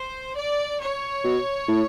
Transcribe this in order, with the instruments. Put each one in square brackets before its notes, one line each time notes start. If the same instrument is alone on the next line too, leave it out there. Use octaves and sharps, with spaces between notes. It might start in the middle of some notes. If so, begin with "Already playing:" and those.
Already playing: [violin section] C5
D5
C#5
[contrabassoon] B2
A2